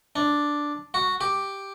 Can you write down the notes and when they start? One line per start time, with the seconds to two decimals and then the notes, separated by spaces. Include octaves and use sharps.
0.16 D4
0.94 F#4
1.21 G4